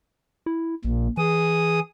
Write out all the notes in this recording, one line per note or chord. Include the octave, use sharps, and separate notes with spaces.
E4
A#1 A#2
E3 G#4 D#6